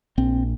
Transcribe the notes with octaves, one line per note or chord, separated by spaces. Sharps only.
A#1 C4